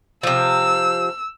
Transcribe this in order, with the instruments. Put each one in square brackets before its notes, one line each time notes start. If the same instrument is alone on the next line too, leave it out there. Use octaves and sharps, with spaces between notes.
[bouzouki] C3 F3 [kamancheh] E6